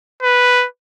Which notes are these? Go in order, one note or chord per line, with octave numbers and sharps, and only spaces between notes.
B4